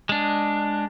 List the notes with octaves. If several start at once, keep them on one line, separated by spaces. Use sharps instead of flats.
G#3 D4